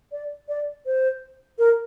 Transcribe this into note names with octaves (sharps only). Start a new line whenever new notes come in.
D5
D5
C5
A#4